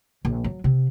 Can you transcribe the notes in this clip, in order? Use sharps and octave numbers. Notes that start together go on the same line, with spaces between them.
A#1
F#3
C3